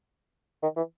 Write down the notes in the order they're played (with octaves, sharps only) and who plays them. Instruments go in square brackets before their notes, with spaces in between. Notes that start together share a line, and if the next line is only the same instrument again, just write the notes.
[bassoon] D#3
E3